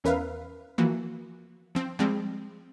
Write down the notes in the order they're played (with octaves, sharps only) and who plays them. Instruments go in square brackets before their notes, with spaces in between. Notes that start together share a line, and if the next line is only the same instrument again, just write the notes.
[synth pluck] E2 C#4 A#4 B4 E5 F5
E3 F3 A#3 F#4
F3 C4
F3 G3 G#3 C4